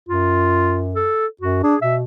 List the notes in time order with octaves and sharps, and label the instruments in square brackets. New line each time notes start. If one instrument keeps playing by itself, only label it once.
[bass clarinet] F#2 [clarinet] F4
[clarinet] A4
[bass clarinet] F#2 [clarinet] F#4
[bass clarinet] D4 [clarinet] G#4
[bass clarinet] B2 [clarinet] E5